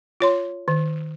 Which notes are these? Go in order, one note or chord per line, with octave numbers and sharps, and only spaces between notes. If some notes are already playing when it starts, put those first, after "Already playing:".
F4 C#5 C6
D#3